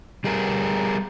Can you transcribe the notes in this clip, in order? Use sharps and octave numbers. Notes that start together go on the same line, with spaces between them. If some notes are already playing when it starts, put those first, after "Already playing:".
G3 G4 G#4 A#4